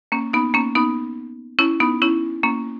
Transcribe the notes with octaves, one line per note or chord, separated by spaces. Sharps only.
A#3 C#4
B3 D#4
A#3 C#4
B3 D#4
C#4 E4
B3 D#4
C#4 E4
A#3 C#4